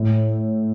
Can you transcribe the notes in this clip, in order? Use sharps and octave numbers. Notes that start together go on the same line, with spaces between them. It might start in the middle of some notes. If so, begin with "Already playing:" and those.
Already playing: A2